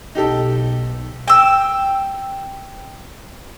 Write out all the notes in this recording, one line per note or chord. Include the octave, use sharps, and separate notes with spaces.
B1 D#4 G4 A4
G5 E6